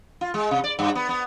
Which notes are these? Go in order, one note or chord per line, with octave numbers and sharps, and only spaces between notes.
F4
G#3
C3
D5
G2
B3
B3